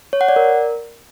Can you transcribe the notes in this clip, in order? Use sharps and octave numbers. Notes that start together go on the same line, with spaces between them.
C#5
F#5
D5
A#4